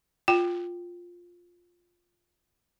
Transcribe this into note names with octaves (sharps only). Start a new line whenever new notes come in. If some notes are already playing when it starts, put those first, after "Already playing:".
F4 G5